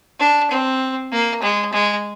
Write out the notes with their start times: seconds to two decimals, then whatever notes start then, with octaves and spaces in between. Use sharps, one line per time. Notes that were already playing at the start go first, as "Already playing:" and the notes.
0.20 D4
0.51 C4
1.12 A#3
1.42 G#3
1.73 G#3